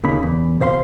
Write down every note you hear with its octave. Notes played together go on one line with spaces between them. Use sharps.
D#2 C#3 A#3 D#4 B5
E2
C3 C5 F5 B5 C6